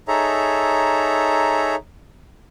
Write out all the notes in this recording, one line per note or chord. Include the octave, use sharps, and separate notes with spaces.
D#4 G#4 A4 C#5 E5 A#5